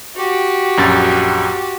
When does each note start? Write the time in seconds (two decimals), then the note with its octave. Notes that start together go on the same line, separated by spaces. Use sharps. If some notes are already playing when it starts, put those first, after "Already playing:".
0.16 F#4 G4
0.77 A#1 F#2 A6